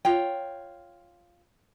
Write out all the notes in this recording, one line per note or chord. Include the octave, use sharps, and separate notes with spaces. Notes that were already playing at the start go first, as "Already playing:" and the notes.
F4 C#5 G5